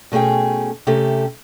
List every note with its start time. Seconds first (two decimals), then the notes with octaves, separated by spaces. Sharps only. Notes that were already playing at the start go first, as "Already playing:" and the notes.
0.12 B2 A3 C#4 G#4 G5
0.87 C3 A3 C#4 G4 A4